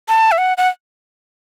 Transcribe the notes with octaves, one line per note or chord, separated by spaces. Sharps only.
A5
E5
F#5
F#5